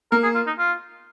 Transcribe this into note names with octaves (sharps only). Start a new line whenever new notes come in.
A#3 A#4
G#4
F4
D#4
F4